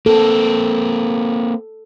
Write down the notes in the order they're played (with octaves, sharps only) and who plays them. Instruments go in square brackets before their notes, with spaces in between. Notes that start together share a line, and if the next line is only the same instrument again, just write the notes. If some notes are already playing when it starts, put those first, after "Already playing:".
[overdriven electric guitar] A#3 C4 [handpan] A4